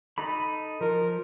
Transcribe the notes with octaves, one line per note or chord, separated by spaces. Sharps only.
D#4 A4 B5
F3 A#4